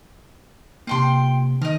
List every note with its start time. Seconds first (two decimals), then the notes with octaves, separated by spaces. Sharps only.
0.87 C3 A#3 F4 G5 C6
1.62 D#3 A#4 D#5